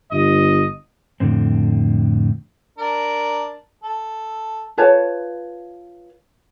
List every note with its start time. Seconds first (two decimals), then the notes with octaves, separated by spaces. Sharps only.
0.11 G1 D#5
1.20 F2 A2 D3 C4
2.78 D4 A#4
3.83 A4
4.77 F4 B4 C#5 A5